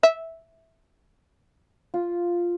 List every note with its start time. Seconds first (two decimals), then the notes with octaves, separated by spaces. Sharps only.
0.03 E5
1.94 F4